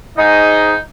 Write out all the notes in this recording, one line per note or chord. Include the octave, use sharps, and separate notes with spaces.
G#2 D#4 D#5